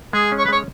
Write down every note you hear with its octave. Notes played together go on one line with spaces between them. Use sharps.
G#3 G#4
C#4
C#5
B4
G#3 C#5